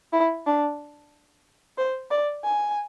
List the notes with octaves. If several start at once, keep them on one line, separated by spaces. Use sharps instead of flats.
E4
D4
C5
D5
G#5